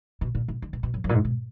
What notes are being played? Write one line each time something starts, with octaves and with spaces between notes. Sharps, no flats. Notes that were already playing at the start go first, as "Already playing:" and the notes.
B2
A#2
B2
D3
B2
B2
F#2
F#2
A#2
G#2
B2